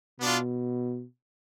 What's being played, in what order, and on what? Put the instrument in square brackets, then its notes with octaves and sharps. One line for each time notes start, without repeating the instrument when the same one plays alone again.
[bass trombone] B2 [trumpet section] B3 D4 F4